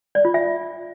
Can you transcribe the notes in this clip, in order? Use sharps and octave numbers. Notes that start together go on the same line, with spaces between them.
D5
F4
E5